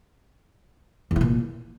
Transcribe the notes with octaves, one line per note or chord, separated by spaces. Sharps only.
E2
E3
A#2